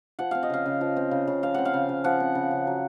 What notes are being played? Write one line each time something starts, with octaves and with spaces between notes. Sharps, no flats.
F3 F#5
C4 F5
D#5
C#3 F5
C#3
F3
C4
C#3
C#3
F3 F5
C4 F#5
F5
C#3
C#3
F3 F#5
C4
C#3
C#3
F#3